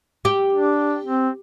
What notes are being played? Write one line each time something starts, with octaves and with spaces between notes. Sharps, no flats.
G4
D4
C4